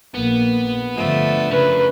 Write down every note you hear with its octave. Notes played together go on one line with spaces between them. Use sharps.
A#1 A#3 B3
G2 D3 F3 A3 D4
C#3 C#4 A#4 B4